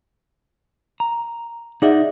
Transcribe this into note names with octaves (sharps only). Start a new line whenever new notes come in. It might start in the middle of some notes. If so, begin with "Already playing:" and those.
A#5
D#4 G#4 D5 E5 F#5